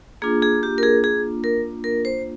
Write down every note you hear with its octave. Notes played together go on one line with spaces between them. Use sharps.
A#3 D4 F4 G#4
G#4
G4
A#4
G#4
G#4
A#4
A#4
C5